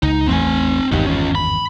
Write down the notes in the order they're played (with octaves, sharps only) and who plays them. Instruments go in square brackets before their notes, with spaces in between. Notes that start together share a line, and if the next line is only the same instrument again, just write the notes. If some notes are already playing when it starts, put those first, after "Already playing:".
[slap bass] C#2 [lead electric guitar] D#4
[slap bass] A1 E2 A3 [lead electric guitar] C4 G#5
[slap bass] G#1 E2 G2 [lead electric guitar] D#4 G4
[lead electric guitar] C#4 F4
B5